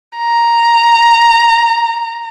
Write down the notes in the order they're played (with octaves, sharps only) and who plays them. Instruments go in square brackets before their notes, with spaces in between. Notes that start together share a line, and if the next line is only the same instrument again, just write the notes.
[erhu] A#5